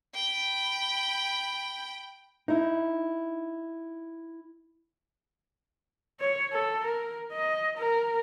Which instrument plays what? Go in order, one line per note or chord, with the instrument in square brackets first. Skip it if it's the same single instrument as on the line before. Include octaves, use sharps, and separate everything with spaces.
[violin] G5 B5
[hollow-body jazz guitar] D#4 E4
[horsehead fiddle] C#5
A4
A#4
D#5
A#4